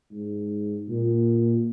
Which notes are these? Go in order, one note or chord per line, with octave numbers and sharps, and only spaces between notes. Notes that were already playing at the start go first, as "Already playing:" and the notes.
G#2
A#2